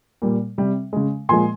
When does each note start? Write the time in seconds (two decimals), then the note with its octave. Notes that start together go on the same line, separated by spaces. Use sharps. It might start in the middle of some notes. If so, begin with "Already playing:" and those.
0.22 A#2 G3
0.58 C3 G3
0.93 C#3 G#3
1.29 A#2 F3 G#3 G#5 C6